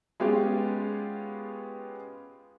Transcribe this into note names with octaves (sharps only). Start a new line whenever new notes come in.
G#3 B3 C#4 F4 G4 G#4